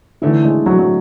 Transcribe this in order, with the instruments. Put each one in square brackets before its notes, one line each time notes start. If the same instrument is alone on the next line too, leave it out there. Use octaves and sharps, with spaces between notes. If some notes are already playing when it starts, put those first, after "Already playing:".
[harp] D3 A3 E4 [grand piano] E3
[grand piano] G#3
F#3
F#3